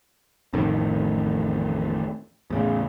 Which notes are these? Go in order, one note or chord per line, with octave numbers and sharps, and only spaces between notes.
A1 F2 A2 D#3
E2 A2 C#3